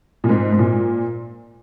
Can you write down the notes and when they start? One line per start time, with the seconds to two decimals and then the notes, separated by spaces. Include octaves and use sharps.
0.24 A#2
0.29 G#2
0.52 G#2
0.59 A#2